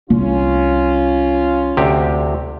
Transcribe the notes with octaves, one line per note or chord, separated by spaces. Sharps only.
C2 C#4 F4
D2 C3 G4